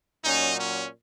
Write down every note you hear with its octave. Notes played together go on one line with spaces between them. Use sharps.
A#2 F#3 C#4 D#4
C#4